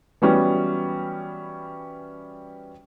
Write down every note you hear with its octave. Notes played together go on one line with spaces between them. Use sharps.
E3 F#3 G3 B3 C#4